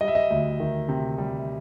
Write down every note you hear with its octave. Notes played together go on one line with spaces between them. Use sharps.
G3 D#5
E5
D#5
D2
D#3
C3
G3